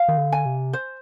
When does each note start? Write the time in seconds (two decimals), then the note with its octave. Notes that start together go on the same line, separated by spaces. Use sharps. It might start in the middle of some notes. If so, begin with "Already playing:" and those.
Already playing: F5
0.08 D#3
0.18 D3
0.32 G#5
0.46 C3
0.73 C5